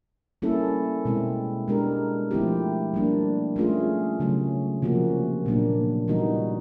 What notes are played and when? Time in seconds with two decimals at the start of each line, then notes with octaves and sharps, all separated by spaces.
0.42 G3 A#3 C#4 E4 A4
1.05 B2 G#3 C4 E4
1.68 G#3 B3 D4 G4 A#4
2.31 F3 A3 C4 E4 G4
2.94 G3 A#3 D4
3.56 A3 C#4 F4 G#4
4.20 C#3 F#3 A3 C#4
4.82 C3 F3 A#3 C#4 F#4
5.46 A#2 F#3 A#3 D4
6.08 E3 G3 B3 D#4 F#4